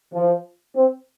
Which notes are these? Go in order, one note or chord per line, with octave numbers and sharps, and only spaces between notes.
F3
C4